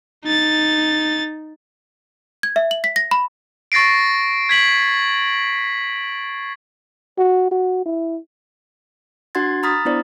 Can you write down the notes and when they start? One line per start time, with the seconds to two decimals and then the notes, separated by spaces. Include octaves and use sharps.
0.25 D#4 A6
2.43 G#6
2.56 E5
2.71 F#7
2.84 B6
2.96 A#6
3.11 B5
3.72 C#6 A6 A#6 C7 D7
4.49 G#6 B6 F#7
7.18 F#4
7.52 F#4
7.85 E4
9.35 D4 F#4 F#5 C6 G#6 A6
9.63 A#5 B5 D#6 F6 A6 B6
9.85 B3 D4 E4 C5 D5